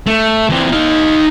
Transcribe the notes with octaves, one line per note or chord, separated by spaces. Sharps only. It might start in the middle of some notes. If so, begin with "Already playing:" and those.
A3
E3 C4
D#4 F5